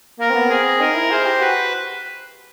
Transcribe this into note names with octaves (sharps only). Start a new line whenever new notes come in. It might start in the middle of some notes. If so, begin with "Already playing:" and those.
A#3 A#4
C4
B3
C4 G#4
D#4 A#4
E4
G#4 C5
G4
F#4 B4